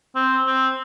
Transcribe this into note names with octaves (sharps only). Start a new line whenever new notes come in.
C4
C4